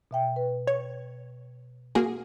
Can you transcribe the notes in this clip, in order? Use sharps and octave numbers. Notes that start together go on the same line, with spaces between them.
B2 E5 G5
B4
C#5
A#3 F#4 G#4